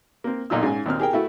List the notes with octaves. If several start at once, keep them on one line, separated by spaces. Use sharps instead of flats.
A#3 C4
B1 A#2 D#4 F4 E6
G#2 C#4 G#5
D#2 A#2 C4 F6
G4 G#4 A#4 G5
A3 E4 F#4